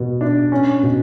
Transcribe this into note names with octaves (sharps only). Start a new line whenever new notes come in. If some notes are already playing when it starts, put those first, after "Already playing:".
Already playing: B2 B3
D4
C#4
B2